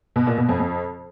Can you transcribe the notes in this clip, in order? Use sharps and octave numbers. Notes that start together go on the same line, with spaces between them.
B2
A#2
B2
F2
F2